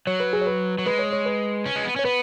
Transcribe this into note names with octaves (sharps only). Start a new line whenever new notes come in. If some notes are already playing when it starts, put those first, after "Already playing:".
F#3 C#5
B4
G#4
C#5
B4
F#3
G#3 B4
C#5
C#5
B4
C#4
G#3
B3
C#4 C#5
B3 B4